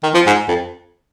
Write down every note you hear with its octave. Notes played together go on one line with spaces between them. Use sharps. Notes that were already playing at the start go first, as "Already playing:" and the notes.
D#3
F3
G#2
F2